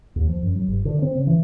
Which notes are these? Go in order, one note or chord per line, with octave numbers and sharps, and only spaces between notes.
D#2
F3
F#2
F#3
G1
D3
C4
C#3
E3